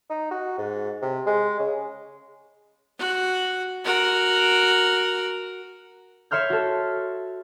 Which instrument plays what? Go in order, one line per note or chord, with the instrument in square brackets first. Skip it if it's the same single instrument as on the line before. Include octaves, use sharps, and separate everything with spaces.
[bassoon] D#4
F#4
G#2
C3
G#3
C#3
[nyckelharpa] F#4
F#4 A#4
[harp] C#5 E5 C6 F6 G6
F#4 A4